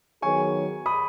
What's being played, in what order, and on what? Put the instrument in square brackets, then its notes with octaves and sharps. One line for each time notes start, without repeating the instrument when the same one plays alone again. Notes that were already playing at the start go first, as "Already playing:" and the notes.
[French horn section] D#3 F#3 B3 G#4 C#5 [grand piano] G#5 C#6
[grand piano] B5 D#6